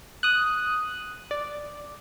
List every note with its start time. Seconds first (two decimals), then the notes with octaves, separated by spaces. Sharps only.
0.23 D#6 F#6
1.31 D5